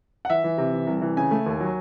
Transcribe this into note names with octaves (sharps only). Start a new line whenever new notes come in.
F#5
E3 E5
E3
C3
E3
C2
E3
C#3 G#5
A3
D#2
F#3